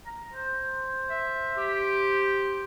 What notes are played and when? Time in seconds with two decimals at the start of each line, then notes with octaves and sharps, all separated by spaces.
0.06 A#5
0.33 C5
1.09 E5
1.57 G4